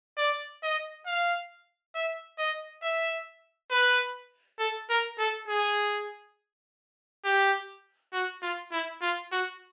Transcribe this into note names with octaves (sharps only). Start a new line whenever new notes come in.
D5
D#5
F5
E5
D#5
E5
B4
A4
A#4
A4
G#4
G4
F#4
F4
E4
F4
F#4